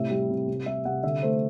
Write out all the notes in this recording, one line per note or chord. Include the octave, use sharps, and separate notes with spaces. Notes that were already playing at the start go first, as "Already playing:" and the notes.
Already playing: A2 C3 E5
G3
C3
C3
G3 E5
C3 F#5
D3 E5
A3 C5